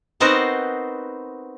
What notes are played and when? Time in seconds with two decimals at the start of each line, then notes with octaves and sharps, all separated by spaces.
0.20 B3 C4 D#4 F#4 A#4 C5